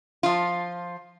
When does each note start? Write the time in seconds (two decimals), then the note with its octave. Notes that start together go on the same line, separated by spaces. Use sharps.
0.23 F3 F4